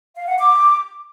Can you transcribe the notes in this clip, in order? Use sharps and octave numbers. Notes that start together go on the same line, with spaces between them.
F5
F#5
D6